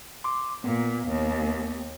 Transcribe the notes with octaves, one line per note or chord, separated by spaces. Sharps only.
C6 D6
A#2 B3
D#2